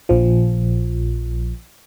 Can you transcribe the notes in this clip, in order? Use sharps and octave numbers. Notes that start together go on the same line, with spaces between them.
A#1 F3